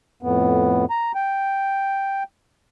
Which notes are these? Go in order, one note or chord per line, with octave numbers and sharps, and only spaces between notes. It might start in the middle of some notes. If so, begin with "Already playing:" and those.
F2 A2 B3
A#5
G5